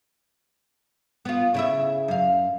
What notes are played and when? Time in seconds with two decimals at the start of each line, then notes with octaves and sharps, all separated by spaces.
1.25 B3 F4
1.54 C#3 E4 E5
2.08 F#2 F5